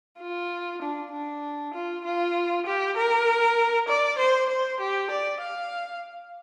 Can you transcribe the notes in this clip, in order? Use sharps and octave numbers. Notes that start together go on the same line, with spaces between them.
F4
D4
D4
F4
F4
G4
A#4
D5
C5
C5
G4
D5
F5